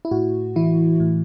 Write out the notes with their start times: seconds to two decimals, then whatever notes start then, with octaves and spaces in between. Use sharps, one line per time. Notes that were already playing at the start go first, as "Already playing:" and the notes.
0.05 E4
0.11 A2 F#4
0.56 E3 E4
1.00 A2